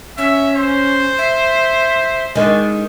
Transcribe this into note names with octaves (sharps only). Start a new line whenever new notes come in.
C#4 E5
C5
E5
D#3 G#3 D4